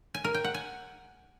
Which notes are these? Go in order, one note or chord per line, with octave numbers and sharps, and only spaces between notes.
G#5
A#4
G5
F#5
G#5